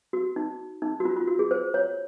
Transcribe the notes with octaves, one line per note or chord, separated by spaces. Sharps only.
F#4
D#4
D#4
F#4
F4
F4
F#4
G#4
C5
C#5